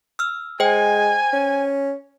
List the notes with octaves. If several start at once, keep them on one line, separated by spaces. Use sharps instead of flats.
E6 F6
G#3 C5 G5 G#5
C#4